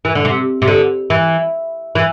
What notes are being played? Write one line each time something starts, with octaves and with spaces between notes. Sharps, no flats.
E3
D3
C3
C3
D3
E3
E3